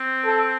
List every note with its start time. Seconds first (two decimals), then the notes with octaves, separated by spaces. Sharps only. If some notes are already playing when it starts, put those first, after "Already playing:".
Already playing: C4
0.25 A4